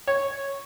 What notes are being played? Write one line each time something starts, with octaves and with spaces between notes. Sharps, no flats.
C#5